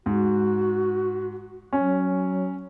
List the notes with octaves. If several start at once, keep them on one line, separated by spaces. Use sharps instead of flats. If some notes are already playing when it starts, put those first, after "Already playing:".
G#2 F#4
F#3 C#4